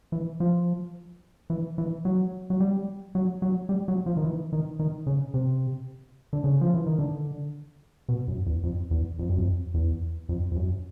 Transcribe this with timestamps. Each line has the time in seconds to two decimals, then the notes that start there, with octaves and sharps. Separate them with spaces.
0.12 E3
0.40 F3
1.50 E3
1.78 E3
2.05 F#3
2.50 F#3
2.60 G3
3.15 F#3
3.42 F#3
3.69 G3
3.88 F#3
4.06 F3
4.17 D#3
4.24 E3
4.53 D#3
4.79 D#3
5.07 C#3
5.34 C3
6.33 D3
6.44 C#3
6.61 F3
6.74 E3
6.86 D#3
6.98 D3
8.09 B2
8.28 F#2
8.46 E2
8.63 F2
8.91 E2
9.19 F2
9.29 F#2
9.39 F2
9.74 E2
10.29 F2
10.51 F2
10.56 F#2